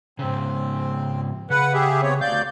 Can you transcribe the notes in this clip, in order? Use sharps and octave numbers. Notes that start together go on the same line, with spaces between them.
G#2 C#3 C4
C#3 B4 F#5
G4 G#4 E5
B3 C4 C#5
D2 D5 F5 G6